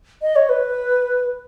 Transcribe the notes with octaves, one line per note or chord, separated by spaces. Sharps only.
D#5
C#5
B4